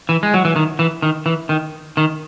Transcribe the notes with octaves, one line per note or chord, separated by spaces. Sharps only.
E3
G#3
F#3
E3
D#3
E3
D#3
E3
D#3
D#3